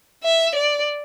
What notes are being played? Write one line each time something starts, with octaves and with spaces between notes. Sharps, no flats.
E5
D5